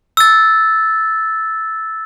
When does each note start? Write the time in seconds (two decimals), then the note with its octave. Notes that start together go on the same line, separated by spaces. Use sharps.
0.17 E6 A6